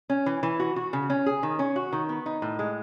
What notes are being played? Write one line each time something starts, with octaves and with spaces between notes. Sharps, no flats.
C#4
E3
E3
F#4
F#4
C#3
C#4
G#4
D#3
C#4
F#4
D#3
B3
D#4
A2
G#3